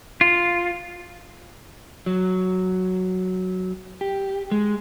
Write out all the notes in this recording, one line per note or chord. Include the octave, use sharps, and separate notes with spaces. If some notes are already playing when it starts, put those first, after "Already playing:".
F4
F#3
G4
G#3